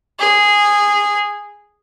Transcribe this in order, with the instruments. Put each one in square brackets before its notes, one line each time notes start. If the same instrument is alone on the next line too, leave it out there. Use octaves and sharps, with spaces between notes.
[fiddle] G#4